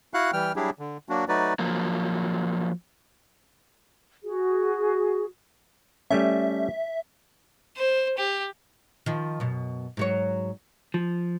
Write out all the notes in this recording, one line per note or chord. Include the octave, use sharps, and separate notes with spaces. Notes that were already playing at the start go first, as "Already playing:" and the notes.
E4 F#4 F5 F#5 F#6
E3 G3 G5 F6
F#3 G3 D4 E4 G4 G#4
D3
F#3 A#3 D4 F#4
F#3 A3 D#4 F#4 B4 D5
F3 F#3 A#3
F#4 G#4
G3 A3 C#4 E5
C5
G4
D#3 F3
F#2 B2
G#2 F#3 C#5
F3